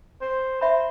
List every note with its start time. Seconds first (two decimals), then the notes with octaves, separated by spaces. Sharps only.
0.21 C5
0.61 C5 E5 B5